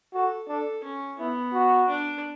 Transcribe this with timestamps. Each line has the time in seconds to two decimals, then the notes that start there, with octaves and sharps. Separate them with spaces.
0.14 F#4 A4
0.48 D4 A4
0.83 C#4
1.19 B3 E4
1.54 F#4
1.88 D4